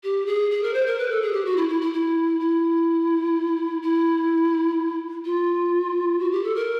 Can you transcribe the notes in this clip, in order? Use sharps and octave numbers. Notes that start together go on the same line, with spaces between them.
G4
G#4
G#4
A#4
C5
A#4
B4
A4
G#4
G4
F#4
E4
E4
E4
E4
E4
E4
F4
F#4
G4
A4
A#4